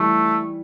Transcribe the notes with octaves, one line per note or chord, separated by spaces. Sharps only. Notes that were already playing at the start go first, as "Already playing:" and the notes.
Already playing: E3 G3 A3